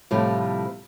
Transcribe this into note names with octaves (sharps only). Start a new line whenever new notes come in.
A2 C3 F3 G3 A3